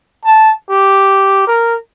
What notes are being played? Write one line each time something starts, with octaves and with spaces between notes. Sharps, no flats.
A5
G4
A#4